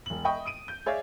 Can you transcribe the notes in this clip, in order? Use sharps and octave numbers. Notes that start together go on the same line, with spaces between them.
E1 F#7
D#5 E5 G5 B5 C#6 D#6
D#6 D7 D#7
G6
G#4 C#5 D5 E5 F5